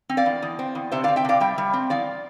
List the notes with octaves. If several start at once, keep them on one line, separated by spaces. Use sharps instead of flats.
C4
D5 F5
E2
E2
C4
E2
C3 C5 E5
D5 F5
C4
E5 G5
C3 D5 F5
G3 E5 G5
G3
C4
E2 D5 F5